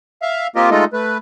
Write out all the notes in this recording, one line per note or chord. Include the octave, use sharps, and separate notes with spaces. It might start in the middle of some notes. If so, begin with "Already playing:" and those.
E5 F5
A#3 C4 F4 G4 A#4 D#5
G#3 A3 D#4 F4 A4 D#5
A3 B4